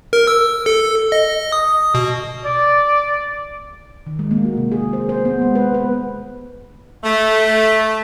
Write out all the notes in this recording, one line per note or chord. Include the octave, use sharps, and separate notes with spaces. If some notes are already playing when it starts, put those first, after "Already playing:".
A#4
E6
A4
D#5
D#6
B2
D5
D#3
G#3
A#3
F#4
C3
G#4
C5
C5
B3
G#3
B4
B4
A3